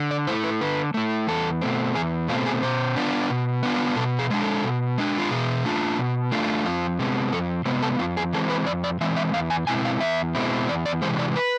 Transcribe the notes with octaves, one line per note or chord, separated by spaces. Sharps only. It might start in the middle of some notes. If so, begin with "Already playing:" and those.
Already playing: D3
D5
A3 E4 C5
B4
D3 B4
A3 E4
E2 A4
B2 A3 C4
E2 G#4
B2 A3 C4 F4
G#4
B2 C5
B3 D4 F4
B2
B3 D4 F4
B2 A4
G#4
G#3 D4
A4
B2
G#3 D4
F4
B2 G#4
A3 D4 F4
B2
A3 D4 F4
F2 F4
C3 G#3 B3
F2 A4
C3 G#3 B3 C5
A4
F2 F4
G#4
E3 G#3 C4 A4
B4
F2 D5
D5
E3 G#3 C4 E5
E5
E2 F5
G#5
B2 G#3 C4 E4 G#5
F5
E2 E5
B2 G#3 C4 E4
E2 D5
D5
C3 E3 G#3 C5
D5
B4